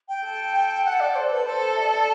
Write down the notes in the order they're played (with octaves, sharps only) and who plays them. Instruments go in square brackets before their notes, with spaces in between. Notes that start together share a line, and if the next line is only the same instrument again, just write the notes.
[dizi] G5
[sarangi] A4
[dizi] F#5
D5
C5
B4
[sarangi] A4 [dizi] C5
[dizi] E5
D5